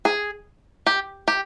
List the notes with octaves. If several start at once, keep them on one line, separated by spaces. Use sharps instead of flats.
G#4
G4
G4